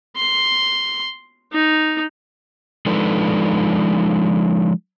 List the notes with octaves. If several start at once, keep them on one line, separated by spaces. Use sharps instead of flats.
C6
D#4
F3 G#3 D4 D#4 A4 B4